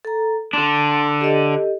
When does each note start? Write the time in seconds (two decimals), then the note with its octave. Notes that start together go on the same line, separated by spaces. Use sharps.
0.05 A4 A#5
0.53 D3 D4 C6
1.21 G4 A4 D#5